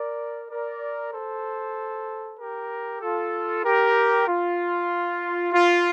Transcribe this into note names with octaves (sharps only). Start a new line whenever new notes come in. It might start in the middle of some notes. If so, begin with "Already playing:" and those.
Already playing: A#4 D5
A#4 D5
A4 C5
G4 A#4
F4 A4
G4 A#4
F4
F4